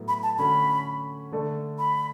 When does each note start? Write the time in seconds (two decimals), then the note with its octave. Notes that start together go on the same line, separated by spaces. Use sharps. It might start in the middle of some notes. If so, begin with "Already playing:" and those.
Already playing: A2 F#3 B3 E4
0.08 B5
0.23 A5
0.38 D3 A3 C#4 F#4 B5
1.32 D3 A3 D4 A4
1.79 B5